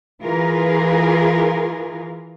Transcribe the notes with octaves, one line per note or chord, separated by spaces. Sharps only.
E3 F4 G#4 A#4 B4